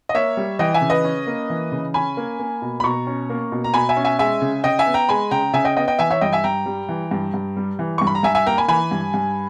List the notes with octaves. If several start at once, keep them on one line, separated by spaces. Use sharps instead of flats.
D#5
A#3 C#5 E5
G3
E3 D#5 G5
E5 G#5
C#3
B4 D#5
C#4
A#3
E3
C#3
C#4 G#5 B5
A#3
A#3
B2
B5
B2 A#5 C#6
C#4
A#3
B2
A#5
B2 G#5 B5
E5 G#5
C#4
E5 G#5
G#3 E5 G#5
C#3
C#3 D#5 G5
E5 G#5
B3
G5 A#5
G#3 G#5 B5
C#3 G5 A#5
C#3 E5 G#5
D#5 G5
B3 D#5 G5
D#5 G5
E3 E5 G#5
C#5 E5
G2 D#5 G5
E5 G#5
G2 G5 A#5
G3
E3
G2
G2
G3
E3
G2 C#6
B5
A#5
G2 E5 G#5
E5 G#5
A#3 G5 A#5
G#5 B5
E3 G#5 B5
G2
G2